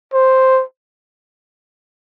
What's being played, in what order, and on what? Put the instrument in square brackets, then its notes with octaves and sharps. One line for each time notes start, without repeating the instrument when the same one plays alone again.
[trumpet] C5